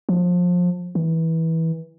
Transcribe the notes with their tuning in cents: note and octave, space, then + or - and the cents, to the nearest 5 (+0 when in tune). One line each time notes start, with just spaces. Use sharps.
F3 +25
E3 -20